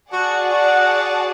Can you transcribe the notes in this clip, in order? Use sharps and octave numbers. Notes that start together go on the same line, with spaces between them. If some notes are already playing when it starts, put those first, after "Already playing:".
F#4 G#4 D5 F#5 A5
F#4